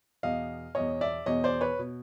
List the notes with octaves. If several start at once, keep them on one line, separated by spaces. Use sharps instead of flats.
E2 B2 D#5 F5
E2 B2 C#5 D#5
D5 E5
E2 B2 C#5 D#5
C5 D5
B4 C#5
B2